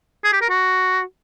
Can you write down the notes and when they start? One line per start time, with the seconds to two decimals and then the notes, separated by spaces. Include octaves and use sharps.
0.24 G#4
0.33 G4
0.41 A#4
0.50 F#4